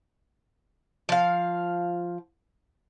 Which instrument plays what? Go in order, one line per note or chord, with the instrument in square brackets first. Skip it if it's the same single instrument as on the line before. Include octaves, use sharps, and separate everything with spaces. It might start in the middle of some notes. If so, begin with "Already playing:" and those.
[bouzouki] F3 F5